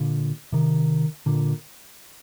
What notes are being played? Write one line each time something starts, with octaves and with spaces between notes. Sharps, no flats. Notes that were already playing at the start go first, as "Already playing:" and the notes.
Already playing: A#2 D3
C3 D#3
A#2 D3